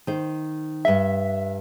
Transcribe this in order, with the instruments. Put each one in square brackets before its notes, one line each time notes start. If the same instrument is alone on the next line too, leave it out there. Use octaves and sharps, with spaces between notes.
[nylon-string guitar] D#3 C5
[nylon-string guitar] G2 D#5 F#5 [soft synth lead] E5